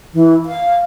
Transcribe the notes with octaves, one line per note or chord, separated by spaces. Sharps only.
E3
F5